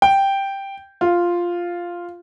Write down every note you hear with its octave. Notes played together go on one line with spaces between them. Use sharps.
G5
F4